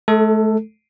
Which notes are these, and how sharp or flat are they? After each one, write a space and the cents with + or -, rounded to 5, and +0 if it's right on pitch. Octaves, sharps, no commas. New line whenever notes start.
A3 -35 A4 +10